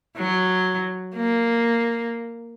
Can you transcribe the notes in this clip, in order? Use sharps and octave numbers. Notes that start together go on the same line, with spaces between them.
F#3
A#3